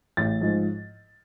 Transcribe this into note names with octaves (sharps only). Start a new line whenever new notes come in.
A1 A6
G#2 F3